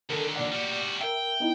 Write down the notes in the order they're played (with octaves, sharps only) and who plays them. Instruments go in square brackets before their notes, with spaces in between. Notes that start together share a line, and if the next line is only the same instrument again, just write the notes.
[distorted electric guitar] D#2 D3 [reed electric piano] A4 A#4
[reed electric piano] A#2 D5 F#5
[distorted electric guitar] G3 F#4
[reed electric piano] A#4 E5 [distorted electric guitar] G5
[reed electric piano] B3 D#4 E4